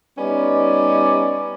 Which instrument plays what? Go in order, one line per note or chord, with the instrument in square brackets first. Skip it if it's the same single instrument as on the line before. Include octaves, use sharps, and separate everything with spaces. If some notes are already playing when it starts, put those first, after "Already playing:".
[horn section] G3 B3 C#4 D#4 D5